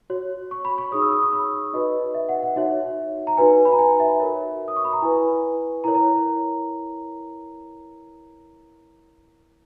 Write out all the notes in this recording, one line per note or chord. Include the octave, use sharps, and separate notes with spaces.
F#4 C#5
C#6
B5
C#6
D#4 G#4 C#5 D#6
E6
D#6
C#6
B5
D#4 F#4 B4 D#5
E5
F#5
F#5
D#4 F#4 C#5 E5
A#5
D#4 F#4 B4 G#5
B5
A#5
G#5
E5
F#4 A#4 C#5
D#6
C#6
B5
A#5
E4 B4 G#5
E4 A#4 C#5 A#5
A#5